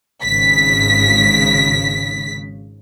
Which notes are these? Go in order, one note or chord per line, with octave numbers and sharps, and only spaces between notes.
G#1 C#3 B6